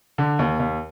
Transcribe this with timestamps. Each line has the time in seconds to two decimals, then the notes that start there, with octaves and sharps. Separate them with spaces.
0.18 D3
0.39 D#2
0.59 D#2